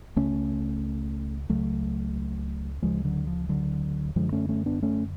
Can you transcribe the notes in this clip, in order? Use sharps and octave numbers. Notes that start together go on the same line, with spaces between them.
C#2 C#3 A3 C#4
C#2 C#3 F#3 A3
D2 C#3 F3 G#3
D3 F#3
F3
D3 F#3
F#2 D3 F3 G#3
A3 C#4
A3 C#4
B3 D4
A3 C#4